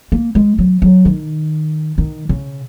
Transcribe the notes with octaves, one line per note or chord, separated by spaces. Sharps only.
A#3
G#3
F#3
F#3
D#3
D#3
C#3